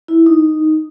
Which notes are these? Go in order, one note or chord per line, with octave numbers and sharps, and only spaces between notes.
E4
D#4